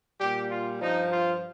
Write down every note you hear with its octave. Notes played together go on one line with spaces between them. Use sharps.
A#2 G3 G4
F4
G2 F3 D#4
F4